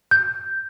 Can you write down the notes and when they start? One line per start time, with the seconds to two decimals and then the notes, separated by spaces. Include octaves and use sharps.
0.11 G6